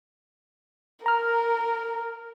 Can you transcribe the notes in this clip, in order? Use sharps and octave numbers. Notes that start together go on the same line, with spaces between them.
A#4 A#5 F6